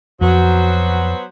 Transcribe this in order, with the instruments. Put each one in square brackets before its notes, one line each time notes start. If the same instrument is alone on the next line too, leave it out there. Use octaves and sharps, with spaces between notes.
[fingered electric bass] F2 [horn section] F#3 B3 C5